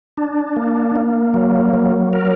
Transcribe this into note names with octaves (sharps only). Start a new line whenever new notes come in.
D4
A#3
A#3
F#3
F#3
A#4